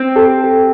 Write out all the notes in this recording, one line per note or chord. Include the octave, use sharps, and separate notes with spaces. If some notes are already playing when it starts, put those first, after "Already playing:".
Already playing: C4
G4 A4
G4 A4